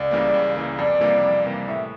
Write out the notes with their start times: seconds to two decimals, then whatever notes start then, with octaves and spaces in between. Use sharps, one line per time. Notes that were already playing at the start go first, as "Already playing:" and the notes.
Already playing: C#2 D5
0.11 C#3 E3 G3 A#3
0.34 C#2
0.56 C#3 E3 G3 A#3
0.79 F2 D5
1.00 C3 E3 G3 A#3
1.23 F2
1.46 C3 E3 G3 A#3
1.68 A2 E5